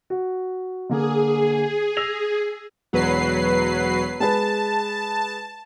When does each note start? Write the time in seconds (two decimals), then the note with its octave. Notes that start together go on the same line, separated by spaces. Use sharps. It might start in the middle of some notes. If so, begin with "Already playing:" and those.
0.10 F#4
0.89 D3 A#3 G#4
1.97 E6 A#6 F7
2.93 E1 F#3 B4 C7
4.20 G#3 G#4 B4 A5